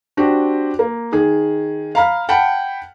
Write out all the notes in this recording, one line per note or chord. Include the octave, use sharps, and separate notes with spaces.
C4 D4 F#4 G4
A#3
D#3 G#4
F5 A#5 B5 F6
F#5 G5 A5 B5